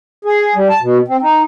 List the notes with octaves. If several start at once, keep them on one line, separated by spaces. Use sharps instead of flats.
G#4
G3
A5
B2
C4
D#4